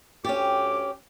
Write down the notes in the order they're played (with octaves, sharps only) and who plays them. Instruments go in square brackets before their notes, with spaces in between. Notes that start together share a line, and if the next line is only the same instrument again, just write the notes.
[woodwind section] D2 D6 [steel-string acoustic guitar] C#4 G4